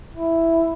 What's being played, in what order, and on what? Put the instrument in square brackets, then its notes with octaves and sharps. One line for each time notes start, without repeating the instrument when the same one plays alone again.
[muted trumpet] E4